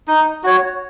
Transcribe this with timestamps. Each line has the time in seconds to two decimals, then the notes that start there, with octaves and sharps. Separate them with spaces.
0.08 D#4
0.44 F#4 C#5